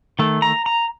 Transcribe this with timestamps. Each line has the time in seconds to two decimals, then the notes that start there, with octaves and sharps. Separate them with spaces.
0.19 D#3 A3
0.42 A#5
0.66 A#5